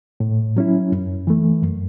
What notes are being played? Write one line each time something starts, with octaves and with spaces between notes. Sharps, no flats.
A2
F#3 C#4 E4
F#2
E3 A3
F#2